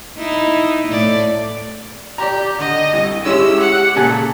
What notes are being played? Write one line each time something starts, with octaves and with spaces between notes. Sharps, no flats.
D#4 E4
A2 D5
G4 D5 A#5
D3 D#5
C2
G#3 C#4 E4 G4 E6
F#5
A#2 C#3 A4 G#5